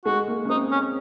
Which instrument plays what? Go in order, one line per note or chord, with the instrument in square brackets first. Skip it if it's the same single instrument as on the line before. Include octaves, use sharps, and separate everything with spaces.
[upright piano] G#3 [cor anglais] F#4
[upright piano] A#3
C#4
[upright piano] C4 [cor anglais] D#4
[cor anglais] C#4